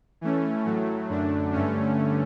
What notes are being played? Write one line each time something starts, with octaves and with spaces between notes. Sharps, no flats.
E3 A3 C#4
A2 F#3 A3
F#2 D3 A3 D4
G2 D3 A3 C#4